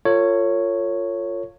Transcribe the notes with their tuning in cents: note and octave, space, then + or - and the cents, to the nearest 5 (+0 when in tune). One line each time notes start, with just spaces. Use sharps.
F4 +0 A4 +45 C#5 +0